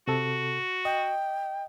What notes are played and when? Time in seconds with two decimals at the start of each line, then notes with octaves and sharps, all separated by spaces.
0.08 C3 F#4 A4
0.85 D#5 G5